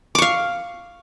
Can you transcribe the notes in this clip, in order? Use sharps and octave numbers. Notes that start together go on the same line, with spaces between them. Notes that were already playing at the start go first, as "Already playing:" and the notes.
F5 C#6 D6